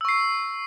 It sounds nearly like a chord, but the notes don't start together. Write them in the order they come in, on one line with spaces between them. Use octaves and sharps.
E6 C#6 C7